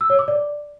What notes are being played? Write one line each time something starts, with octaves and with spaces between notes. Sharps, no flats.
E6
C#5
D6
D5